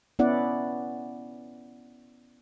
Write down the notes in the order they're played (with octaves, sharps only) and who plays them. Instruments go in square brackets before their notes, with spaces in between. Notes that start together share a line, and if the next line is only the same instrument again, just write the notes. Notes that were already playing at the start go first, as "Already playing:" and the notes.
[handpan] B3 C#4 E4 D5 F#5